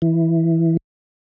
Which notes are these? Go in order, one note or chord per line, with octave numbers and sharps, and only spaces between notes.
E3